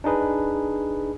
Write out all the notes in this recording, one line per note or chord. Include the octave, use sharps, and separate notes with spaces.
D4 D#4 G#4 B4